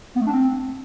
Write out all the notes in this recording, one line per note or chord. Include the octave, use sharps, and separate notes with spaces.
B3
A3
D4
C4